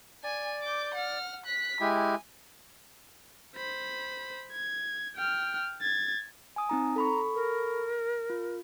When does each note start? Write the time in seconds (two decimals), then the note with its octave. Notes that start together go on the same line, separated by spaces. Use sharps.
0.24 D5 G#5
0.62 D6 G6
0.94 F#5 F6
1.46 F#6 B6
1.80 G#3 E4 G4 G#5
3.56 C5 B5
4.52 G#6
5.16 G5 F6
5.81 G#6 A6
6.56 G#5 D#6
6.69 C4 D#4 A#5
6.96 A4 A#5 B5 C#6
7.35 A#4
8.30 F4